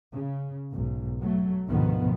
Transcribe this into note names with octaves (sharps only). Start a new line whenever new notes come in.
C#3
B1 G#2
F#3 A3
D2 G#2 B2 D#3 F3 B3